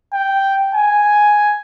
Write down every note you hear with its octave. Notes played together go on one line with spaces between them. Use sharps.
G5
G#5